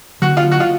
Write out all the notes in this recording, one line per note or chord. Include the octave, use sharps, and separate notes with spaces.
D3 F#3 A#3 F#4
F4
F#4
F4